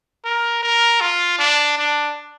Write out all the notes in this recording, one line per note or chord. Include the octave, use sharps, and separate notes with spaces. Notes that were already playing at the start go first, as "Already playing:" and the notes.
A#4
A#4
F4
D4
D4